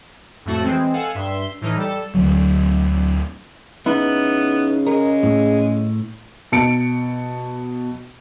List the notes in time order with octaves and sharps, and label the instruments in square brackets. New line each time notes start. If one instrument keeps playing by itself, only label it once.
[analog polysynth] F2 A2 A3 F#4
E3 G#3 C4
A4 F5 F#5 G#5
G2 E5 C6
A2 E3 D#4 F6
G3 A4
[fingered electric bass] D2 D3 F#3
[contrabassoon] C#3 [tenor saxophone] B3 [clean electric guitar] D#4 E4
[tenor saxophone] G#3 [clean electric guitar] A#4
[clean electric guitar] A2
[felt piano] B2 A5 C#7 D7